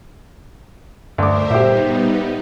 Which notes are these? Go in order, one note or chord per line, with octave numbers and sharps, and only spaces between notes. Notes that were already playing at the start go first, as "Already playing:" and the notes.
D2 G2 A#4 C5 E5 D6
A#2 G3 B3 D#4 G4 C5 E5